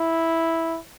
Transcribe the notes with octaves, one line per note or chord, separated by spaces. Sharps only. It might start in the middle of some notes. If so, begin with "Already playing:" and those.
Already playing: E4